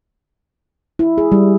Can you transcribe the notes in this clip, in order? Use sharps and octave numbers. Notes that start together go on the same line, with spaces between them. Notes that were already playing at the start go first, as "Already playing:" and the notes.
E4
G#4
G3